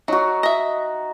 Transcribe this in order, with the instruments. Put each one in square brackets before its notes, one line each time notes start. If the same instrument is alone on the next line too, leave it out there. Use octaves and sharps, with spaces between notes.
[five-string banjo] F#3 [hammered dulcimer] D#4 F#4
[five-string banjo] D#5 E5